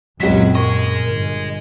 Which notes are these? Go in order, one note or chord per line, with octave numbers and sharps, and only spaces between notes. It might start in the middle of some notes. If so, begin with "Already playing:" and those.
C#2 F#2 A#2 F#3 C4 B6
G#4 A#4 D#5 C#6
G1